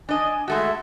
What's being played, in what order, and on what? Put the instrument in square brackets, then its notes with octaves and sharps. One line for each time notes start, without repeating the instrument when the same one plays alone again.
[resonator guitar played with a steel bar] D4 D#5 [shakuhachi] G#5
[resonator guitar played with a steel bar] G#3 A3 F#4 [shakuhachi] E5